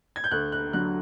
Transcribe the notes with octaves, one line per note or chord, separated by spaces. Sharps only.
G#6
G6
D2 F#6
F#6
D3 F#3 F#6